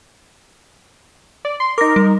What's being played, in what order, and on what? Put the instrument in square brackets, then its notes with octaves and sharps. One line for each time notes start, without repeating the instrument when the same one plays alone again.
[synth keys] D5
C6
[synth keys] D#4 A#4 [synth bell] D6 A#6
[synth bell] G3